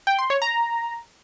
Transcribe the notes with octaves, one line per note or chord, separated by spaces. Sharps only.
G5
C6
C#5
A#5